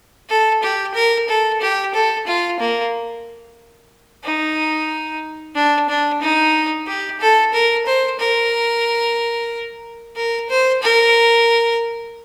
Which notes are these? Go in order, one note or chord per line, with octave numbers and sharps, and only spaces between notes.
A4
G4
A#4
A4
G4
A4
F4
A#3
D#4
D4
D4
D#4
G4
A4
A#4
C5
A#4
A#4
C5
A#4